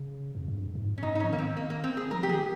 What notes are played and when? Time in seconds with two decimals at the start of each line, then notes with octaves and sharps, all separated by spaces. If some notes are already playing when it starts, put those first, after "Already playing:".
Already playing: C#3
0.35 F2
0.48 G2
0.75 G#2
0.98 C#4
1.02 G#2 D#4
1.15 D#4
1.20 C#4
1.24 F3
1.30 D#3 A#3
1.38 C4
1.57 A#3
1.70 A#3
1.84 C4
1.97 G#4
2.11 F3 A#4
2.23 G4
2.29 D#3 G#4